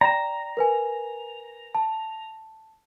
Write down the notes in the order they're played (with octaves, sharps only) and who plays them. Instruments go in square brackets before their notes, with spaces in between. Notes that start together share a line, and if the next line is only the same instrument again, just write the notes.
[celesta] D5 G5 E7 [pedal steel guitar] A#5
[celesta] A#4 B4 G#5
A5